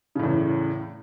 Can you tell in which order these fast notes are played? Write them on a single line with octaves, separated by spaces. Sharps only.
C#3 A2 E2